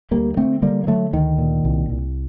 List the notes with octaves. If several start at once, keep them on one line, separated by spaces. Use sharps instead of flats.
D2 G3 A#3
D3 A3 C4
D3 G3 A#3
A#3
D3 F#3 A3
D2 D#3
A#2
C2
C2